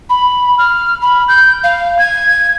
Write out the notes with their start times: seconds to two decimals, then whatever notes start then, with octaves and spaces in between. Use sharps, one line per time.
0.10 B5
0.59 F6
1.02 B5
1.29 G6
1.64 F5
1.99 G#6